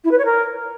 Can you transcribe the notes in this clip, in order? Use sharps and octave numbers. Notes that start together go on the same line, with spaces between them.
E4
B4
C#5
A#4